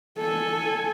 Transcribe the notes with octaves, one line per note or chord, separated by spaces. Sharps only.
A4 G#5